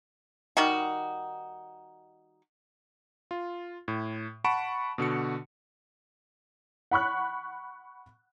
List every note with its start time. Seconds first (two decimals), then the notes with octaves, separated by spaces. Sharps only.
0.57 D#3 G3 D#4 F#4
3.31 F4
3.88 A2
4.44 F#5 A5 B5 C#6 D7 E7
4.98 B2 D3 F#4 C#7
6.91 F#5 B5 C#6 F#6